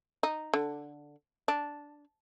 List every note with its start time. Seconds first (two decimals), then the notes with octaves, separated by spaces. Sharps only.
0.23 D#4
0.54 D3
1.48 D4